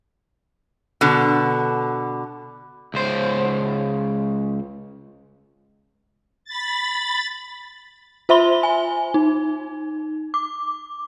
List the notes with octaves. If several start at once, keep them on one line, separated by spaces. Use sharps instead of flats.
B2 D3
C#2 C5
B5 A6
F4 C5 E5 B5 C6 G7
G#5
D#4
D6